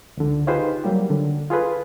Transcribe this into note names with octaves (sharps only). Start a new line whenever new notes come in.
C#2 D3
D#4 F4 G4 G#4 B4 C5
F#3 G3 A#3 G4
D3
F4 G#4 A4 B4